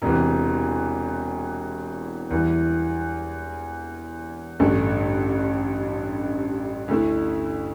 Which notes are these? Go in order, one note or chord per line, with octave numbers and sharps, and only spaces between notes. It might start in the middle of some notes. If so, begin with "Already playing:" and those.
E1 E2 C3 E3
E2 E3 G3 E4
A1 G2 D3 A3
D2 D3 A3 E4